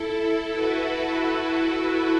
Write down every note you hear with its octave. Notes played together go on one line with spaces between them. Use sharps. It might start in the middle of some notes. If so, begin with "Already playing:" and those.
Already playing: E4 A4
F#4 B4